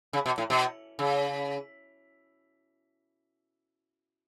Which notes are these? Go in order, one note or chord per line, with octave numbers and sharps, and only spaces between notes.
C#3
B2
A2
B2
C#3